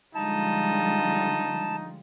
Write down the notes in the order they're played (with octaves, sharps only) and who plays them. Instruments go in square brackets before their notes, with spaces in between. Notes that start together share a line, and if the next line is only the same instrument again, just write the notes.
[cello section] D3 F3 G#3 [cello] G3 F4 [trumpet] D#4 [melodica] A5